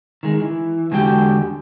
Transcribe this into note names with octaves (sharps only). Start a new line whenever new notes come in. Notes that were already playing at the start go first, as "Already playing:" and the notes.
D#3 G#3
E3
E2 D3 G#3 F#4 G4 G5